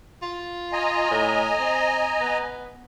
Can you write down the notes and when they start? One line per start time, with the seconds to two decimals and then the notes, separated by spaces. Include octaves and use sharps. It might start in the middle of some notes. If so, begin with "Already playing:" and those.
0.22 F4
0.73 D#5 G#5 A#5
1.11 A2
1.60 C4
2.21 B3